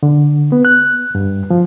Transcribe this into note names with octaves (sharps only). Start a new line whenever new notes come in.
D3
B3
F#6
G2
F3